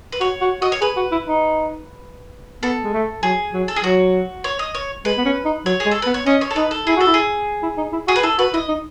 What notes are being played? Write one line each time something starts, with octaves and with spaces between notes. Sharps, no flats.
B4
F#4 C#5
F#4
F#4 D#5
C#5
G#4 B4
F#4
E4
D#4
B3 A4
G#3
A3
F#3 G#4
F#3
A4
G#4
F#3 F#4
C#5
D#5
C#5
G#3 B4
B3
C#4
D#4
F#3 C#5
G#4
G#3
A4
B3 B4
C#5
C#4 D#5
C#5
A4
D#4 B4
A4
E4 G#4
F#4 A4
E4
G#4
E4
D#4
E4
F#4 G#4
B4
E4 A4
F#4 B4
E4 D#5
D#4